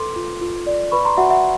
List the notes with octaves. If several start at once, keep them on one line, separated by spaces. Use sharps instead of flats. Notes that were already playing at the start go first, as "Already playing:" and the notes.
Already playing: A4 B4 C6 D6
F4
F4
D5
B4 B5 C#6
A#5 C6
F#4 E5 F#5
E5 F#5